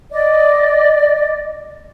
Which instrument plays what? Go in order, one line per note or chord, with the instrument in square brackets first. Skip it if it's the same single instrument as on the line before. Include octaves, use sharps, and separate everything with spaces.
[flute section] D5 D#5